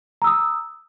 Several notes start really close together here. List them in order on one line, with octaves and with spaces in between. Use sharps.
A#5 E6 D#6